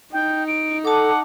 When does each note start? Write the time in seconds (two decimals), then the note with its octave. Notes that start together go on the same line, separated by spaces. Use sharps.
0.13 D#4 G5
0.48 D7
0.85 A4 F#5 A5 D6